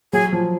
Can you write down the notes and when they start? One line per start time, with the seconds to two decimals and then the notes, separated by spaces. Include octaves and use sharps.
0.13 F#3 G#4
0.33 F3